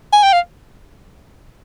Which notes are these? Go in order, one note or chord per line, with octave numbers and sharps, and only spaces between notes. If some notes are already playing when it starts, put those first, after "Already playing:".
G#5
G5
F5